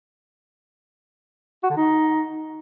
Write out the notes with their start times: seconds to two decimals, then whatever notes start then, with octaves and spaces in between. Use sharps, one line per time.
1.63 F#4
1.70 D3
1.77 D#4